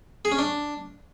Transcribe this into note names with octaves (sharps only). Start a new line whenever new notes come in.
G#4
C#4
D4